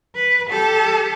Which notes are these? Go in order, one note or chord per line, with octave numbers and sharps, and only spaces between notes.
B4
G4 A4